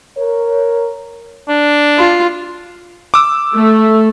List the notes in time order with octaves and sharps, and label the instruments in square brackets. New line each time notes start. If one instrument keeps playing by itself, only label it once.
[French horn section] A#4 C#5
[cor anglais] D4
[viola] F4
[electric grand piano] D6 E6
[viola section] A3